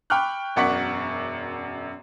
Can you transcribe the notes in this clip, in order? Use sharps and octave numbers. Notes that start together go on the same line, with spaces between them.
G5 B5 C#6 D6 F6 F#6
E1 F#2 D5 F#5 C#6 B6